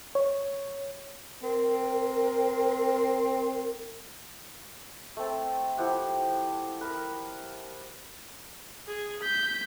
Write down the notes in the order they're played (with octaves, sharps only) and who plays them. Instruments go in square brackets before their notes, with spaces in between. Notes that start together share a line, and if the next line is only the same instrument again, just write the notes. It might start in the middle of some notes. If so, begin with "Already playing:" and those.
[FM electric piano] C#5
[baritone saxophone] C4 [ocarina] A#4
[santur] A3 C4 A5
F3 E4 G4 F#5
A#4 B4
[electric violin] G#4
G6 B6